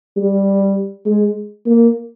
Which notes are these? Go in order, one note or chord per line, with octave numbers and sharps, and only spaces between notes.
G3
G#3
A#3